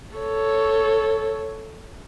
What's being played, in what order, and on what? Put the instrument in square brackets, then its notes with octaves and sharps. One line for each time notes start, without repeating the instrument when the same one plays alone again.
[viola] A4 C#5